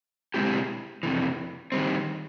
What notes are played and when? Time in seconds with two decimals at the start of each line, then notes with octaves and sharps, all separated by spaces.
0.34 B2 G#3 C4 E4 G4
1.03 F2 C3 E3
1.72 D#3 G3 C4